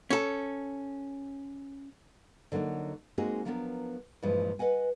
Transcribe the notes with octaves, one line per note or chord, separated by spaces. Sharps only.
C#4 A4
D3 F#3 A#3 D4 D#4
G#3 A#3 C4 D#4 F#4 G#4
F3 F#3 B3 D4 G#4 A#4
G2 A#2 E3 F3 G#3
B4 D#5 F#5 G#5